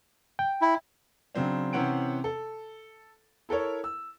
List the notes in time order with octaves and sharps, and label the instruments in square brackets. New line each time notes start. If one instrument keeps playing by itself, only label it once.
[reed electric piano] G5
[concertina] E4
[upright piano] C#3 F#3 C4 D4
C3 E3 C4 C#4 F#5 D7
A4
E4 A4 A#4 C#5
E6